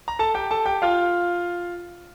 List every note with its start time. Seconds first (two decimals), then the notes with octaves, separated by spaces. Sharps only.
0.08 A#5
0.19 A4 A5
0.34 G4 G5
0.51 A4 A5
0.66 G4 G5
0.82 F4 F5